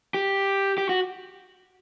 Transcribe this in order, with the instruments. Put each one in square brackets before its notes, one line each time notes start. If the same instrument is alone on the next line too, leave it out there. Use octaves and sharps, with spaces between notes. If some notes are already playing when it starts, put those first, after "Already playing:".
[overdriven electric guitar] G4
G4
F#4